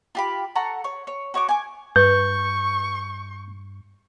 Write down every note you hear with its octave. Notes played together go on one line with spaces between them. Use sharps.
F4 G4 B5
A4 F#5 A#5 C#6
C#5
C#5
F#4 C#5 C#6 D6
G#5 D6
G2 B4 C#6 G6